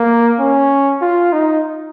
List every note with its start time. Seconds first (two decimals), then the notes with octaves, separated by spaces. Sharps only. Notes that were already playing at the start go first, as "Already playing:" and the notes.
Already playing: A#3
0.39 C#4
1.02 F4
1.33 D#4